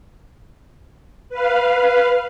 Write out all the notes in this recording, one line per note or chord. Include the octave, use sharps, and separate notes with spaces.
B4 F5